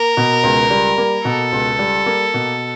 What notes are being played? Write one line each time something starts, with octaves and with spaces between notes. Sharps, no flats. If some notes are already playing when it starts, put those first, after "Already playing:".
Already playing: A#3 A#4
B2
C#2
G3
A#3
B2 A4
C#2
G3
A#3
B2